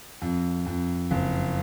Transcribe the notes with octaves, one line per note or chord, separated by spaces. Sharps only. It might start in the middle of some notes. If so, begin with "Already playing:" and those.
F2
F2
F#1